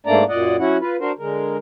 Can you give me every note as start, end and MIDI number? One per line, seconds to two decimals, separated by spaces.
0.06 0.24 44
0.06 0.24 57
0.06 0.24 58
0.06 0.24 62
0.06 0.24 74
0.06 0.24 82
0.29 0.56 42
0.29 0.56 46
0.29 0.56 74
0.29 0.56 75
0.29 0.56 78
0.59 0.77 54
0.59 0.77 61
0.59 0.77 64
0.59 0.77 66
0.59 0.77 78
0.80 0.97 65
0.80 0.97 71
1.00 1.12 62
1.00 1.12 66
1.00 1.12 70
1.00 1.12 72
1.19 1.57 50
1.19 1.57 56
1.19 1.57 70